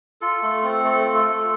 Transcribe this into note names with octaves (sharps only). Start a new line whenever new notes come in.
F4 A4
A3 A4
C4 A4
A3 A4
F4
A4
A3